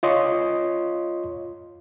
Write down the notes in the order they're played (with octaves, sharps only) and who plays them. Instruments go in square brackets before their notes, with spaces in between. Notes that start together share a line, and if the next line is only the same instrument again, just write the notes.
[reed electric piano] F4 C#5 D#5 C6